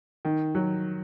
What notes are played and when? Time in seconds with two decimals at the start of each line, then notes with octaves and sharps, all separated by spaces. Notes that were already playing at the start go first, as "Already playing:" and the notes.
0.25 D#3
0.55 F#3